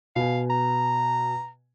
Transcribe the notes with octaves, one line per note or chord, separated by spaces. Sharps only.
B2 F5 G#5
A#5